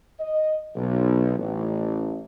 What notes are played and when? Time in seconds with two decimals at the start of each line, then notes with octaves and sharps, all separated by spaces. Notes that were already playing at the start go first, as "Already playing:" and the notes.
0.20 D#5
0.76 B1
1.38 A1